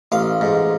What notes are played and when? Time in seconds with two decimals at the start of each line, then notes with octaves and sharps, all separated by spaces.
0.12 A1 F5
0.41 G#2